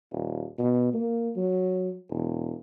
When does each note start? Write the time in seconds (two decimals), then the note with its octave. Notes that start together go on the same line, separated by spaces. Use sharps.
0.12 D#1
0.59 B2
0.94 A#3
1.36 F#3
2.10 E1